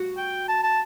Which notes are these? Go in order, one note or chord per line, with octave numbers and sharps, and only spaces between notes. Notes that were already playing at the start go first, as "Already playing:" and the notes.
Already playing: F#4
G5
A5
A5